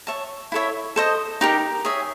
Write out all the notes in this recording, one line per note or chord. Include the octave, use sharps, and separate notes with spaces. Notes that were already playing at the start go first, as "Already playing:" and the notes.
C#5 E5 A5
E4 A4 C#5 E5
A4 C5 D#5
D#4 G4 A#4
G#4 C#5 E5